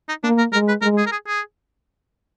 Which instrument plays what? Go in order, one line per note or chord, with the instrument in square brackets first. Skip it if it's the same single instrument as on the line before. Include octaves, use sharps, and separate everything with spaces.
[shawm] D#4
[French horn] A#3 [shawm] D4
[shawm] A#4
[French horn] G#3 [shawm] A#4
[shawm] B4
[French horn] G#3 [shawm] A#4
[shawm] G#4
A#4
G#4
G#4